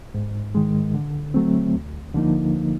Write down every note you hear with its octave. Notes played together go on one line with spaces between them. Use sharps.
G#2
D#3 G#3
D3
F#3 A3 C4
D2
D3 F3 A#3 D#4